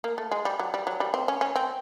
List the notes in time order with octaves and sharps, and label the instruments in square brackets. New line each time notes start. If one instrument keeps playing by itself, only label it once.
[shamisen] A#3
A3
G#3
G3
F#3
G3
F#3
G3
C4
C#4
C#4
C4